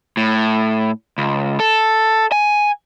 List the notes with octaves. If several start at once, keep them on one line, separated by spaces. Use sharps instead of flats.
A2
C#2
A4
G#5